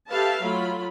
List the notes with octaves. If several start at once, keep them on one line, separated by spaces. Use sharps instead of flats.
G4 A4 B4 E5 F5 A5
F#3 A3 F4 B5